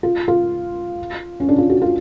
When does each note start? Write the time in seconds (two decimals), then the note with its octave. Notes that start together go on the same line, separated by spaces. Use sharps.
0.03 F4
0.28 F4
1.40 C#4
1.49 D4
1.58 F4
1.70 F#4
1.82 F4